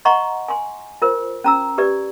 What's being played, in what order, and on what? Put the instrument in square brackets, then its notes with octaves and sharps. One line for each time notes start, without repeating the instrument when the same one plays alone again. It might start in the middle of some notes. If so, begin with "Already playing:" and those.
[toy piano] D#5 F#5 A#5 C6 C#6
G#5 C6
F4 A#4 C5
C#4 A#5 E6
G4 B4 D5